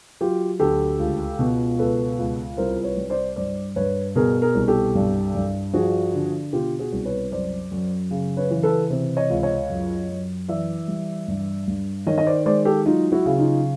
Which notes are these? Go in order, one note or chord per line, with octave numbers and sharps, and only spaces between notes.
F#3 F4 G4
D2 G4 A4
C#2
B2
C#2 A4 B4
C#2
C2 A#4 C5
B4 C#5
G3
C5 D5
G2 C5 D5
G2 B4 C#5
B2 G#4 A#4
G#4 A#4
C2
G4 A4
G2
G2
F3 F#4 G#4
D3
B2 F4 G4
F#4 G#4
C2
B4 C#5
F#2 C5 D5
F#2
C#3
B4 C#5
E3
A4 B4
C3
C#5 D#5
C#2
C#5 D#5
F#2
F#2
E3 D5 E5
G3
G2
G2
D#3 C#5 D#5
D#5
C5 D5
G#3 C5 D5
G4 A4
F#3 D#4 F4
E4 F#4
C#3
D#4 F4